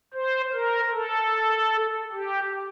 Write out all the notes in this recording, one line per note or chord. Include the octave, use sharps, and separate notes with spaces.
C5
A#4
A4
G4